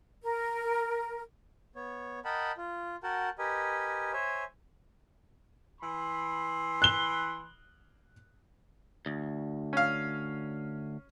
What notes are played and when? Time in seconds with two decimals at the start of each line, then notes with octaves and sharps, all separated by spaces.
0.23 A#4
1.76 B3 C#5
2.25 A#4 D#5 F#5 G5 A5 B5
2.58 F4
3.03 F#4 A#4 F#5 G5 A5
3.39 G4 A#4 B4 D#5 G#5
4.13 C5 C#5 E5 G#5
5.80 E3 B5 C6
6.82 F#6 G7
9.06 D2
9.73 C#4 F5